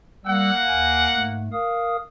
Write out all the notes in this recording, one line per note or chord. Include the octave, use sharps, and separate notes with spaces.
G3 A#3 F#5 E6
D#2 G#5
G#2 A3
A#4 F5 D#6